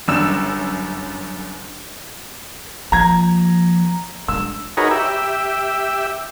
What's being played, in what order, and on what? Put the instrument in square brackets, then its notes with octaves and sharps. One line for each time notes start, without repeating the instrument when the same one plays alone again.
[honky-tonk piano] G1 F#2 E6 E7
[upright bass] F3 A#3 [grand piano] A#5 G#6
[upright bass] G#3 D4 [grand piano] E6
[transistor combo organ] D#4 F#4 G#4 A#4 B4 C#5
G4 E5